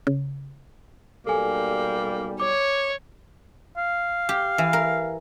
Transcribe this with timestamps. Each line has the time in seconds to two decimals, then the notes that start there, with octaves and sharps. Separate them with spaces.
0.07 C#3
1.27 B1 G3 A#3 A4 G#5
2.40 C#5 D6
3.77 F5
4.29 G4
4.58 E3
4.73 A#4